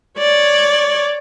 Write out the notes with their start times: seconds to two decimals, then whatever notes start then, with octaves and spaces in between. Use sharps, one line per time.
0.18 C#5 D5